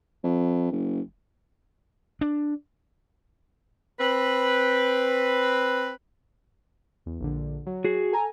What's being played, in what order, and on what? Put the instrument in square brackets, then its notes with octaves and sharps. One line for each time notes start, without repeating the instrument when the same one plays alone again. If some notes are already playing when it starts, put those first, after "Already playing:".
[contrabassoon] F2
F#1
[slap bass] D4
[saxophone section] C4 B4
[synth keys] E2
A#1 D3
F#3
[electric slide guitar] F#4 G#4
[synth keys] A4 G#5 A#5